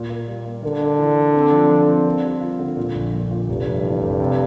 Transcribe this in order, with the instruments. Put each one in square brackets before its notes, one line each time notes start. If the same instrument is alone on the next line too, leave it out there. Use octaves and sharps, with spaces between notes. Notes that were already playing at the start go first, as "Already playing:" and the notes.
Already playing: [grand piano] A#2
A#3
G3
A#3
[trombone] D3 [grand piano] A#3
[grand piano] D4
E3
D4
C4
F3
F3
C4
A#3
G3
F4
D3
A#2
A#1
A#2
A#2
[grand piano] F1 [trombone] G2
[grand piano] F1
E3
F1
C3